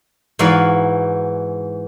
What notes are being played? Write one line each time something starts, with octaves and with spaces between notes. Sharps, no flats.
G#2 E3 F#4 D5 F5 B5